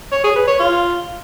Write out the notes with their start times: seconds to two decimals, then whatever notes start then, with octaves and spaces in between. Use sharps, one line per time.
0.12 C#5
0.24 G#4
0.36 B4
0.47 C#5
0.59 F4